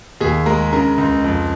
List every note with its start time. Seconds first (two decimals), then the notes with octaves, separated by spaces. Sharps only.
0.21 D#2 G#4
0.46 G#3 A#4
0.73 C#3 A#4
0.98 C#2
1.24 F2